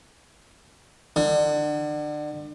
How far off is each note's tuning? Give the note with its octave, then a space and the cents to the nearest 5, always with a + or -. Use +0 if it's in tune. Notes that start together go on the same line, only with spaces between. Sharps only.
D3 +30